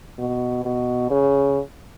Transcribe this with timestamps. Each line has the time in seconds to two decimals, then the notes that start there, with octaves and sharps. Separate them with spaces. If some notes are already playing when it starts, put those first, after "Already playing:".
0.19 B2
0.65 B2
1.10 C#3